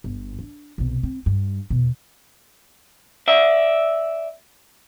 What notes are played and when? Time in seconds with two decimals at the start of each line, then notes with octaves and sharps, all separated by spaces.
0.04 G1
0.39 D4
0.78 B1 C3
1.03 C4
1.26 G2
1.70 E2 B2
3.28 D5 E5